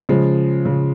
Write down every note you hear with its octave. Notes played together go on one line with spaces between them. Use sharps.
C#3 F3 G#3
C#3 F3